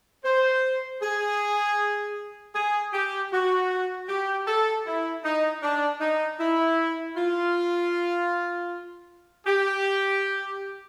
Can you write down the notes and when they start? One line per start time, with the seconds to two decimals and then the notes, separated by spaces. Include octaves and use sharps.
0.25 C5
1.02 G#4
2.55 G#4
2.94 G4
3.32 F#4
4.09 G4
4.47 A4
4.86 E4
5.24 D#4
5.63 D4
6.01 D#4
6.39 E4
7.16 F4
9.47 G4